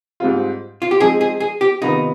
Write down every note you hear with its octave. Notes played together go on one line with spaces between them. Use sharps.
G#2 G3 C4 F4
F4
G4
F3 G#3 C4 D#4 G#4
G#4
G#4
G4
C3 D#3 B3 D#4 F4